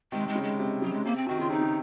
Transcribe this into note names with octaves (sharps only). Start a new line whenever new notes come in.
C3 D#3 G#3
D#3 G#3
C#3
G#3
C3
C#3 F#3
G#3
C3 A#3
C4
D#3 F#4
C#3 F4
C3 D#4
C#3